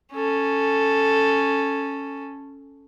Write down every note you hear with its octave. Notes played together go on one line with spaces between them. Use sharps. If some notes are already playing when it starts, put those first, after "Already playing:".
C#4 A4